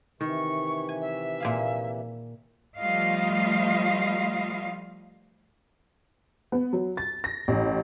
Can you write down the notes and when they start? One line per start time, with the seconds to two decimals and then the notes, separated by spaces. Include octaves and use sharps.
0.21 C3 D#3 E3 C#6
0.89 G#5
1.01 E5
1.40 A#2 G#4 F5
2.78 F3 G3 A3 F4 D#5 F5
6.52 B3
6.73 F#3
6.97 A6
7.24 A#6
7.48 A1